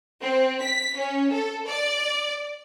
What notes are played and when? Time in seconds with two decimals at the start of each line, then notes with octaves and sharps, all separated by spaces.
0.20 C4
0.60 B6
0.96 C#4
1.31 A4
1.65 D5